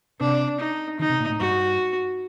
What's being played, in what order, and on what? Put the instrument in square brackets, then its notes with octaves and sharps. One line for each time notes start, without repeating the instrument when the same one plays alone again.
[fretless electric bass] C3 [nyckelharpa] D4
[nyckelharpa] D#4
[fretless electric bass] D#3 [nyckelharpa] D#4
[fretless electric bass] C3
A#2
A2
[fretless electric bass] G2 [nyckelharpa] F#4